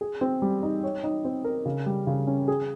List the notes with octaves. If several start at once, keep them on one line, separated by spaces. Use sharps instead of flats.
G#4
C4
G3
D#4
C#5
D#4
C4
A#4
C#3
G3
C#3
C#4
G#4